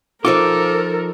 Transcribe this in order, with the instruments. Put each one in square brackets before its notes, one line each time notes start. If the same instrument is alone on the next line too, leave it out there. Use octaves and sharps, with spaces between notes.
[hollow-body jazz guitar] F3 D#4 F4 [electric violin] A4 [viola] A#4 [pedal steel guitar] D6